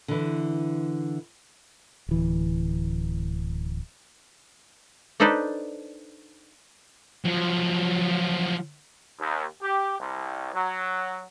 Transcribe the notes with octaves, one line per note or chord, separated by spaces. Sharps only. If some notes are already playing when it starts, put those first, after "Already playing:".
D3 E3
D1 E3
D4 D#4 A4 B4 C5 D5
F3 F#3
D#2
G4
C2
F#3